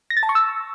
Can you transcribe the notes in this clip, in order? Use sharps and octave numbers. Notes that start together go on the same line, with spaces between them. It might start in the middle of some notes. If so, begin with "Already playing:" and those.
A#6
A6
A5
C#6
E6